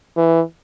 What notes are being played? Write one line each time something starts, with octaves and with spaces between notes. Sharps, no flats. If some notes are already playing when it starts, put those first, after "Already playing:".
E3